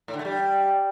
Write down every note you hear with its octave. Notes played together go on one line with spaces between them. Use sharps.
A2
D3
A3
G3